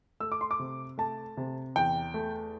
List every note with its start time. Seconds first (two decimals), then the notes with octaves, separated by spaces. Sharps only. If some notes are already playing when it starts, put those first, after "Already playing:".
0.20 A3 E6
0.32 D6
0.41 C6
0.51 D6
0.59 C3
0.98 A3 A5
1.37 C3
1.76 E2 G5
2.14 A3